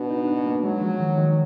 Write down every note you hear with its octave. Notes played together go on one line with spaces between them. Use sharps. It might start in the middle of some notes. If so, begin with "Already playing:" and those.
Already playing: B2 D4
D#4
D4
A#3
F#3 G#3
F3
D#3
D#3